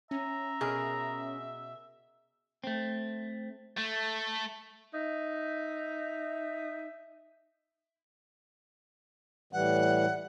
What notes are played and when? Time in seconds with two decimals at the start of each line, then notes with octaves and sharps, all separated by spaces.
0.11 C#4 E5 A#5
0.61 B2 G#4 A#4
2.64 A3 C4
3.77 A3
4.94 D#4 E5
9.53 A2 E3 G3 F#5